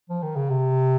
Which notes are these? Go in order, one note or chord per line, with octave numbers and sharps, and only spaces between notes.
F3
D#3
C#3
C3